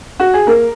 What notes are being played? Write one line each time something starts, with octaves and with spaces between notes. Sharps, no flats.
F#4
G#4
A#3 A#4